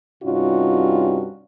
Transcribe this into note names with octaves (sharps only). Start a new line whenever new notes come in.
G2 C3 C#4 D#4 F4 F#4